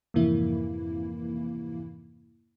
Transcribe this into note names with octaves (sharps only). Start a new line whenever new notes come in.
F2 G#2 C3 E3 A#3 E4